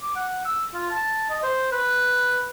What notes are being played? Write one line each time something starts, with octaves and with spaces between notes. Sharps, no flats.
D6
F#5
E6
F4
A5
D#5
C5
B4